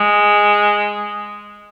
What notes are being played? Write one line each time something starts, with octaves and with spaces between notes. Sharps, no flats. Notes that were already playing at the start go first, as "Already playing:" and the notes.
Already playing: G#3